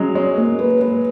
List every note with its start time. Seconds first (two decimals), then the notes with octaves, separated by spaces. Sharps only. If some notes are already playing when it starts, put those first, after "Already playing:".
Already playing: F#3 G#3 C#4
0.15 G#3 C#5
0.37 A#3
0.59 B4
0.81 B4